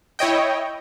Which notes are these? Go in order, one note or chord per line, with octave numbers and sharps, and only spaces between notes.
E4 C#5 D#5 G5